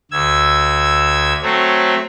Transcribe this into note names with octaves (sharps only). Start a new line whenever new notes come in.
D2 E6 G#6
F#3 A3 C4 C#5